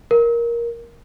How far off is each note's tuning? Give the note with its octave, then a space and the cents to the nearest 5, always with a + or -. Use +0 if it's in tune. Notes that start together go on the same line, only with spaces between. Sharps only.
A#4 +10